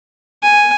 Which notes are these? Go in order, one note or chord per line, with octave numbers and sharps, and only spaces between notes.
G#5